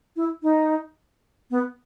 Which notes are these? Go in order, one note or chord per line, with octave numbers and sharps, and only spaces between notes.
E4
D#4
B3